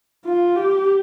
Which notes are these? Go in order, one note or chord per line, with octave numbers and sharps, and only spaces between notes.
F4
G4